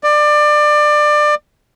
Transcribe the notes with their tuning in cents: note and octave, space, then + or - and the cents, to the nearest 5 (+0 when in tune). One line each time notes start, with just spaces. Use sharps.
D5 +25